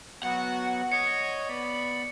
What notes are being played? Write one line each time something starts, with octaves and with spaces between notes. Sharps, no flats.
F#3 B3 F#4 F#5
C#5 D#5 C#6 C#7
B3 D5 B5